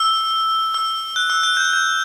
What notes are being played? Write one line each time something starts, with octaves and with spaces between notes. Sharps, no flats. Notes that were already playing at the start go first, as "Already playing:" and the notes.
Already playing: E6
E6
F#6
E6
F#6
G6
F#6
G6